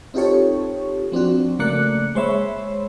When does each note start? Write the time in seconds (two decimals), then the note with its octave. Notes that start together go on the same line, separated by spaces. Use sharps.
0.14 C4 D#4 F4 G4 A4 C#5
1.12 F3 C4 D4 F#4
1.59 C#3 A3 A#3 D5 F#6 C#7
2.15 G#3 C5 C#5 E5 B5